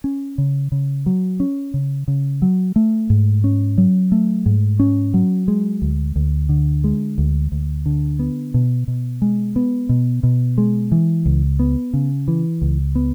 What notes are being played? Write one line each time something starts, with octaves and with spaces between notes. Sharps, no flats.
C#4
C#3
C#3
F#3
C#4
C#3
C#3
F#3
A3
G#2
C#4
F#3
A3
G#2
C#4
F#3
G#3
D2
D2
D3
G#3
D2
D2
D3
B3
B2
B2
G#3
B3
B2
B2
G#3
E3
C#2
B3
C#3
E3
C#2
B3